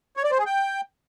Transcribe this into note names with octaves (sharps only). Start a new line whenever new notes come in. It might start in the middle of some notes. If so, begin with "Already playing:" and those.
C#5
D5
C5
G#4
G5